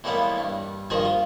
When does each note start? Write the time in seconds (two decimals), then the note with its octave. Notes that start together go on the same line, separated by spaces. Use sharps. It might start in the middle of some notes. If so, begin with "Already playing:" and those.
0.04 A2 E3 G3 G#3 A#3 B3
0.38 G2
0.90 A#1 G2 D#3 F3 G#4 D#5
1.05 F4